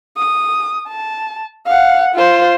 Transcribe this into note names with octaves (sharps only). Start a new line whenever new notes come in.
D#6
A5
F5 F#5
F4 C5